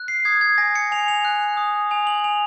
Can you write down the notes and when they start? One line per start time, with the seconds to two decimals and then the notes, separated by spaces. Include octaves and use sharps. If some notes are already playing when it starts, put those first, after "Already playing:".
Already playing: F#6
0.08 C7
0.25 D#6 G#6
0.41 G#6
0.58 G#5 A#6
0.76 C#7
0.92 G#5 F7
1.08 F7
1.25 F#6
1.57 D#6
1.91 G#5 F7
2.07 F#7
2.24 G#5 F7